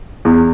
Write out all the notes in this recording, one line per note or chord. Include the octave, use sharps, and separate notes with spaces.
E2